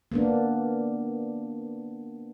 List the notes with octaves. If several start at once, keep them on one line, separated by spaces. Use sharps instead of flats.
A#3 B3 D4